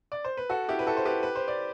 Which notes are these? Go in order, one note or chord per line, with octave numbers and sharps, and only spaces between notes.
D5
C5
B4
F#4 A4
E4 G4
B4
F#4 A4
C5
G4 B4
B4
C5
D5